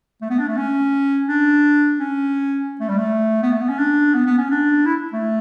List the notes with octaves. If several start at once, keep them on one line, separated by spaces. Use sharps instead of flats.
A3
B3
D4
A3
C#4
D4
C#4
A3
G3
A3
B3
A3
B3
C#4
D4
B3
B3
C#4
D4
E4
A3